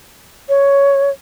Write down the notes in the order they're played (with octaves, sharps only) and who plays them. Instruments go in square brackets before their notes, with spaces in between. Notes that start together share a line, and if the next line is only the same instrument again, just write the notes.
[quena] C#5